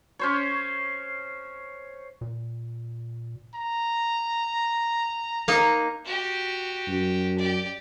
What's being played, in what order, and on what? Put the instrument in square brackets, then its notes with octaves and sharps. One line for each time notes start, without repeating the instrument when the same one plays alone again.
[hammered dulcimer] C#4 C5 C#5
[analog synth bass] A#2
[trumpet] A#5
[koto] A#3 D#4
[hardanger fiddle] F#4 G4
[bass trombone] F#2
[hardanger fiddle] G4 D5